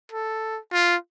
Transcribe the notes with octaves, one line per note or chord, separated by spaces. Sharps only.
A4
F4